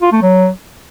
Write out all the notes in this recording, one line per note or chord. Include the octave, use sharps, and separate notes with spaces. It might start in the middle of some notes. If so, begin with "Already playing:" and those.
F4
A3
F#3